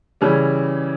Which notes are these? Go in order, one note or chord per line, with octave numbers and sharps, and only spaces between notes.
C#3 E3 G3 C#4